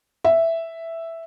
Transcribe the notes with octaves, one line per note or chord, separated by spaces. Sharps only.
E5